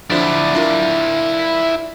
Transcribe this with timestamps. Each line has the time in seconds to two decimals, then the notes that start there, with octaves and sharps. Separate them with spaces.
0.10 D3 F3 D4 E4 D5
0.55 D4 F4 A#4